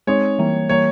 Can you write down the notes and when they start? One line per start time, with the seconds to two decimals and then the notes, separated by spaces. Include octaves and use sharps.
0.07 G#3 C4 D#4 C#5
0.39 E3 G3 A#3
0.69 E3 G3 A#3 C#5